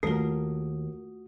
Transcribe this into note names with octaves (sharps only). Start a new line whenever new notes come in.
D#2 A3 F4 F#4 A#4 D#6